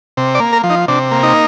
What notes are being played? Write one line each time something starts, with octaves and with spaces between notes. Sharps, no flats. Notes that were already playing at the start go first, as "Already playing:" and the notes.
C3
D5
A#3
A#4
F3
D#4
C3 D4
A#3
D#4